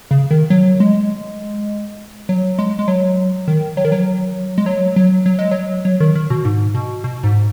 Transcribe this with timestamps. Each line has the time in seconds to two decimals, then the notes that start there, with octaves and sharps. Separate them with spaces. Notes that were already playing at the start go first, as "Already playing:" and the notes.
0.11 C#3
0.31 D#3
0.50 F#3
0.80 G#3
2.29 F#3
2.59 G#3
2.79 G#3
2.88 F#3
3.48 D#3
3.77 F#3
3.85 D#3
3.92 F#3
4.58 G#3
4.66 F#3
4.96 F#3
5.26 F#3
5.39 G#3
5.51 F#3
5.85 F#3
6.00 D#3
6.15 D#3
6.30 B2
6.45 G#2
6.74 B2
7.04 B2
7.23 G#2